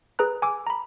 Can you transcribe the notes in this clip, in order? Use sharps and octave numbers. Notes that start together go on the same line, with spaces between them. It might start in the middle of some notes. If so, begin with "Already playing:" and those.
G#4 B4 A#5 F#6
G#5 D6 E6
A#5 B5